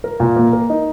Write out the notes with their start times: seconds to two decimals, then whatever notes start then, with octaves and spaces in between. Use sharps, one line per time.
0.04 A#4
0.20 A#2
0.36 A#3
0.53 A#4
0.70 D#4